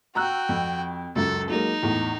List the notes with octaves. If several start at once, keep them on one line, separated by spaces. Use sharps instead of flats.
F#4 G5 A#5 E6 F#6
F2
C#2 F#2 A4
F#3 G#3 A#3 D#4
E2 A2